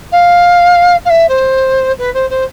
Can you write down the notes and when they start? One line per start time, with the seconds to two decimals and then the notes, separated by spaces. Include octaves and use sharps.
0.11 F5
1.05 F5
1.09 E5
1.28 C5
1.98 B4
2.13 C5
2.30 C5